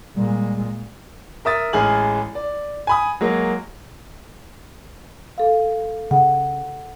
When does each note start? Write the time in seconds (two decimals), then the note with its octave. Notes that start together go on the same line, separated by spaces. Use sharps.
0.16 A#2 G3 G#3
1.45 A#4 E5 D#6 A6
1.73 A1 G#3 G#4 G#5 F6 F#7
2.35 D5
2.87 G#5 B5 D#6
3.21 F#3 G#3 A#3
5.38 A4 F5
6.11 C#3 F#5